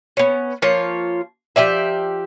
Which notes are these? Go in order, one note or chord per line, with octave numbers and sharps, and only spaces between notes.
B3 C#4
F3 A#3 F4 C#5
F3 G4 D5 E5